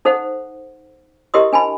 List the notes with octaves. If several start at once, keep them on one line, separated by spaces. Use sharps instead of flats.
D#4 A4 C5 F#5
E4 G4 A#4 D#5 C6 D#6
D4 G#5 A5 B5